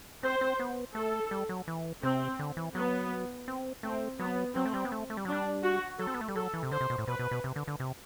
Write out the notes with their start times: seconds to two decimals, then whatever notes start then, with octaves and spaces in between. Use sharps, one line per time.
0.23 C4 C5
0.41 C4
0.60 B3
0.95 A3 A4
1.31 G3
1.49 F#3
1.68 E3
2.03 C3 C4
2.39 D3
2.57 E3
2.75 F#3 B3
3.48 C4
3.83 A3 C4
4.19 F#3 B3
4.55 F#3 C4
4.65 A3
4.74 G3
4.85 B3
4.92 A3
5.10 A3
5.17 G3
5.25 F#3
5.28 G3 D4
5.63 F#4
5.99 F#3 A4
6.07 C4
6.14 B3
6.21 A3
6.28 G3
6.35 F#3 A4
6.54 E3
6.63 C3
6.71 D3 C5
6.81 C3
6.90 B2
6.98 A2
7.07 B2 B4
7.19 B2
7.31 B2
7.44 C3
7.56 D3
7.67 D3
7.80 C3